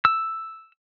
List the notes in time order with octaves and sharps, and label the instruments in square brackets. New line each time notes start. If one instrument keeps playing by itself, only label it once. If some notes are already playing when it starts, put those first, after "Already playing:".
[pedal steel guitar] E6